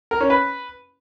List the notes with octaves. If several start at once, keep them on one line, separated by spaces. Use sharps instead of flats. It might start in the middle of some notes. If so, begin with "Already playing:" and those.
A#4
C#4
B4